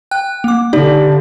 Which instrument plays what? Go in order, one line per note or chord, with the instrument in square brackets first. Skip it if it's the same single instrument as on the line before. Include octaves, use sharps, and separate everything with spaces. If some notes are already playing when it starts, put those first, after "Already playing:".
[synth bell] G5 F#6
A#3 D6
[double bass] D3 [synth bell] D#4 G4 D5